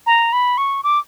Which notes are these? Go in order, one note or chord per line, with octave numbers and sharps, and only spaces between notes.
A#5
B5
C#6
D6